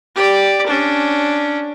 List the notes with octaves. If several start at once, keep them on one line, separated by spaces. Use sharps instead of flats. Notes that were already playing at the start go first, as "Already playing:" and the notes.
G4 D5
C#4 D4